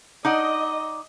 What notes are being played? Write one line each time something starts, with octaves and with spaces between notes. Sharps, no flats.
D#4 D5 D#5 F#5